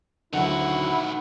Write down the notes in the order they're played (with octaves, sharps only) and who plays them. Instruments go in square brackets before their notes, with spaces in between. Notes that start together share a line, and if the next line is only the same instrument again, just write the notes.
[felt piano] D2 F#3 [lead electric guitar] D#3 F#4 [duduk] E4 [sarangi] F#5